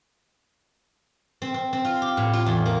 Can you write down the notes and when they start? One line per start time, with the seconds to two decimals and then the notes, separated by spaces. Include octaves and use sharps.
1.42 C4
1.54 C4
1.73 C4
1.85 F4
2.02 G4
2.17 A2
2.33 F4
2.46 E2
2.65 A#3